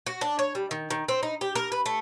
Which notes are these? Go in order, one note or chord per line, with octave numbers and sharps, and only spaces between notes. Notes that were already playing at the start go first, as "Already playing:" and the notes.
F#4
D4
C#5
G3
D#3
D#3
C4
D#4
G4
A#4
B4
A3